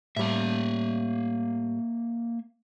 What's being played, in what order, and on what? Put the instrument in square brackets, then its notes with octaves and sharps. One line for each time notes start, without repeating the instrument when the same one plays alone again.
[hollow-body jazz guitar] A2 G3 [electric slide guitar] A#3 E5